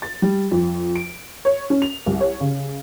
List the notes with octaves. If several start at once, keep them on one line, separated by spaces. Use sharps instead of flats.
A6
G3
F2
D7
C#5
C#4
F7
C2
C#5
C#3